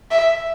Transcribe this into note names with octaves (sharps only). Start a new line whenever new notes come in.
E5